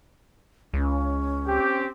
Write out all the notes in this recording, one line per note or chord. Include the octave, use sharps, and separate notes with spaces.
C#2 C#4
C4 G4